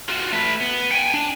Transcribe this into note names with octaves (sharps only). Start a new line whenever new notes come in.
F4 F#4
A3 B4
B3
G5 G#5
D4